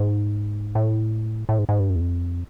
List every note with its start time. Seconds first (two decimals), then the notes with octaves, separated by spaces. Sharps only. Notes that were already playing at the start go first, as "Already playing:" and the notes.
Already playing: G#2
0.75 A2
1.49 A2
1.59 G#2
1.69 G#2
1.80 G2
1.90 F#2
1.96 E2
2.00 F2